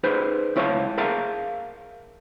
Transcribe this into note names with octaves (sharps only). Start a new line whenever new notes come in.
D#4 G#4 B4 C5
C#2 E4 C#5 D#5 F5 A5
G#4 A#4 E5 F5 A5